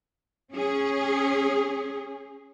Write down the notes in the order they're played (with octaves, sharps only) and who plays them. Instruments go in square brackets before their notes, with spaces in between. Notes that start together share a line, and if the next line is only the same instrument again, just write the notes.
[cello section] C#4 G#4